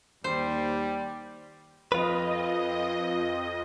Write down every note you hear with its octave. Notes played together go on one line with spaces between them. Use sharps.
D#2 G3 C5
F2 F4 B4 D#5